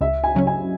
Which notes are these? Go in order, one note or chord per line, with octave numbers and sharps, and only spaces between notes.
C#2 E5
G#5
C#3 F#3 C#4
G#5